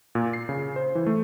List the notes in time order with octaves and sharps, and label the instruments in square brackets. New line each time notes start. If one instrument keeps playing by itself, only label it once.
[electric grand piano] A#2
C7
C#3
C5
E3
A3